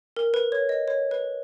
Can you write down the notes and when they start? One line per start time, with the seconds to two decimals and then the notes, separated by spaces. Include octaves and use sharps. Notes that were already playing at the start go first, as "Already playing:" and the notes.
0.16 A#4
0.34 B4
0.52 C#5
0.69 D#5
0.88 C#5
1.11 B4